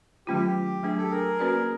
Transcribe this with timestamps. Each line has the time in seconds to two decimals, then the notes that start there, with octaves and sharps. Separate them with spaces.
0.27 D#3 F#3 A3 C#4 F4 G4
0.83 F#3 A3 D4 G#4
0.97 G4 A4
1.11 G#4 A#4
1.39 A#3 C#4 F#4 B4 D5